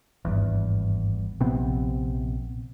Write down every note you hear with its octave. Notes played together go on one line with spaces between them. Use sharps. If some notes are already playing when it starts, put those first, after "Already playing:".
G#1 E2 G2
A#1 C3 B3 C4